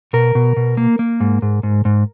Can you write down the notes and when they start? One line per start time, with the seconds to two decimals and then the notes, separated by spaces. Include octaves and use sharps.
0.13 B2 A#4
0.35 B2
0.57 B2
0.77 A#3
0.99 A#3
1.20 G#2
1.42 G#2
1.63 G#2
1.85 G#2